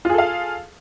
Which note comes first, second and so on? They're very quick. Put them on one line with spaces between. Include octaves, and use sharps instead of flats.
F4 G#4 A4 F5